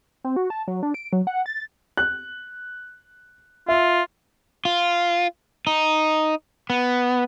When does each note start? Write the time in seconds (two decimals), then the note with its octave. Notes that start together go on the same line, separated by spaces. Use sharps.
0.24 C4
0.36 F#4
0.50 A5
0.68 F#3
0.83 D4
0.94 D7
1.13 F#3
1.27 F#5
1.46 A6
1.97 F#6
3.68 F4 E5
4.65 F4
5.67 D#4
6.70 B3